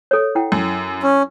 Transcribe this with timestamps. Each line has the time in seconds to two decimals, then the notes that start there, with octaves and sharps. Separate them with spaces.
0.11 A4 C#5
0.35 E4 F#5 G5
0.52 F#2
1.03 C#4